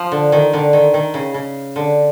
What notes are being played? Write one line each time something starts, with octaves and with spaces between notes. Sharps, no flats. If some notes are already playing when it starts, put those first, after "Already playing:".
Already playing: F3
D3
D#3
D3
D#3
D#3
C#3
C#3
D3